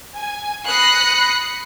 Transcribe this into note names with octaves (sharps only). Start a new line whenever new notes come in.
G#5
B5 D#6 F#6 A#6 C7 C#7